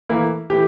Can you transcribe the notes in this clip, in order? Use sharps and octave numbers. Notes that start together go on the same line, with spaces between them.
E3 A3 A#3 E4
E3 A3 E4 G4